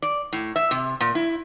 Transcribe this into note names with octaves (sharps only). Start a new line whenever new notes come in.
D5
A2
E5
C3
A#2
E4